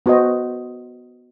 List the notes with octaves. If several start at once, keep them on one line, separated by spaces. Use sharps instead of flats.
B3 F#4 C5 D#5